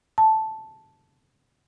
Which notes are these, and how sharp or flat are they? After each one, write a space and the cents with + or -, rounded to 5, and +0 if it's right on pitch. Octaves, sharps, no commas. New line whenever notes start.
A5 -5